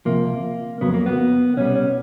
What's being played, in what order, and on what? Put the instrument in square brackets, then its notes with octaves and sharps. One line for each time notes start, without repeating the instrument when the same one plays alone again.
[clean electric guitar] C#2 C3 F3 A#3
F2 C#3 F#3 B3
A#3
B3
C2 B2 G3 C#4
C#4